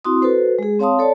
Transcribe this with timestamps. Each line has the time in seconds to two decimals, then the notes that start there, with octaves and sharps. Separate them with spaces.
0.04 C4 E4 F#4 C6 D#6
0.22 F#4 A4 B4 C5
0.59 G#3 G#4
0.80 C4 C#5 F5 A5 C6 D#6
0.99 A4 C#5 D5 A5